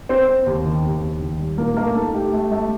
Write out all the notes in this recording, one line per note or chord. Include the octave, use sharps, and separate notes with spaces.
C4 C5
C4
D#2
D#3
D#2
D#2
D#3
G3
A#2 A#3 A#4
A3 A#3 A#4
D#4 A4
A3 G4
A3
A3